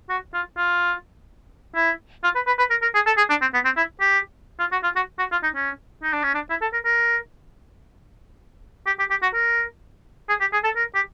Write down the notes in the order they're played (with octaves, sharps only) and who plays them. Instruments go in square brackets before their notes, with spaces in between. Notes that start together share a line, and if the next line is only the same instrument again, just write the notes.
[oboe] F#4
F4
F4
E4
F4
B4
B4
B4
A#4
A#4
G#4
A4
G#4
D4
C4
B3
C4
E4
G4
F4
F#4
F4
F#4
F#4
F4
D#4
C#4
D#4
D4
C#4
D4
E4
A4
A#4
A#4
G4
G4
G4
F#4
A#4
G#4
G4
G#4
A4
A#4
G4